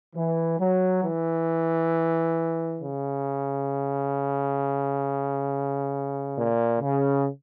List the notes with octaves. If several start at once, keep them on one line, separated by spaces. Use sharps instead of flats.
E3
F#3
E3
C#3
A#2
C#3